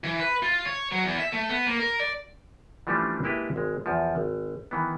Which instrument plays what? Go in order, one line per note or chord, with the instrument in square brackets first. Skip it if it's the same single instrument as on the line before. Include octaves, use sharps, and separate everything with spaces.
[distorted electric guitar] E3
B4
F4
C#5
F#3
E2
E5
A3
B3
A#3
A#4
D5
[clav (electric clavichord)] E3 F3 G3 A3 C#4 D4
G#3 A#3 E4 G4 A4 B4
G#1 G#3
E2 F3
G#1
D#3 E3 B3